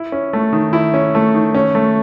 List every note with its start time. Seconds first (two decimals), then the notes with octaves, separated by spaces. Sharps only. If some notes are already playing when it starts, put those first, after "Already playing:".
Already playing: E4
0.12 C#4
0.33 A3
0.53 D#3
0.73 E4
0.94 C#4
1.15 A3
1.34 D#3
1.55 C#4
1.75 A3